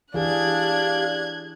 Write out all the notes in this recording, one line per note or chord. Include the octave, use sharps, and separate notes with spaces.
E3 D4 G4 G#4 F5 F#6 G#6